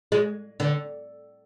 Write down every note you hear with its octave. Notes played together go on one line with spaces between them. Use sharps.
G#3
D3